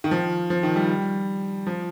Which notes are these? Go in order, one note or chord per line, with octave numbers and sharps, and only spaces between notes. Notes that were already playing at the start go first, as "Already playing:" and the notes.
D#3
F3
F3
D#3
G3
F3